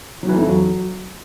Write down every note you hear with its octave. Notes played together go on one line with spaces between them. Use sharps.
F#3
E3
F2
D3
F#3